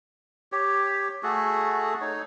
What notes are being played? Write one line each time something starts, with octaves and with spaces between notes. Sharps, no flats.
G4 C#5
A3 F#4 G#4 A4
D#4 C#5